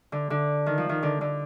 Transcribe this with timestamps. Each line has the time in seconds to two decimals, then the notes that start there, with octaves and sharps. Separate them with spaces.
0.12 D3
0.30 D3
0.66 D#3
0.78 F3
0.89 D#3
1.03 D3
1.21 D3